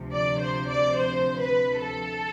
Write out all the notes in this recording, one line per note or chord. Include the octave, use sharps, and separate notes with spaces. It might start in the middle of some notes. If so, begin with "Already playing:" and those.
Already playing: D2 C3 F3
D5
C5
D5
C5
B4
A4